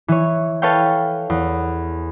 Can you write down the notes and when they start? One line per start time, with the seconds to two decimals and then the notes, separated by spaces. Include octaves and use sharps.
0.08 E3 C#5
0.62 A4 B4 C#5 F5 G5
1.30 E2